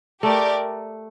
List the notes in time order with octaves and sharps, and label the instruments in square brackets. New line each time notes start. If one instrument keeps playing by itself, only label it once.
[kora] A3 [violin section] G4 A#4 D5